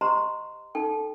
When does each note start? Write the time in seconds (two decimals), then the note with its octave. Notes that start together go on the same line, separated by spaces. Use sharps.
0.01 G4 C5 D#5 A#5 C6
0.75 D#4 A4 G5